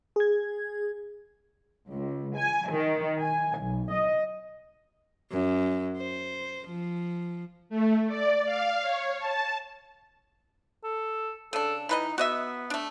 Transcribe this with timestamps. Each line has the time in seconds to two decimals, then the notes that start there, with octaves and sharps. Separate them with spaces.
0.16 G#4 G#6
1.88 C#2
2.37 G#5
2.71 D#3
3.20 G#5
3.59 B1
3.92 D#5
5.31 F#2
5.97 C5
6.67 F3
7.69 A3
8.08 D5
8.45 F5
8.82 C#5
9.19 A5
10.84 A4
11.53 C#3 D4 A4
11.89 E3 D#4 B4 D#5
12.18 B3 F#4 D#5 E5
12.70 A3 D4